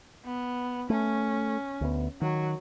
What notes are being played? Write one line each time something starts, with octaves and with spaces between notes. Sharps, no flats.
B3
A3 C#4
D2 B3
D#3 F#3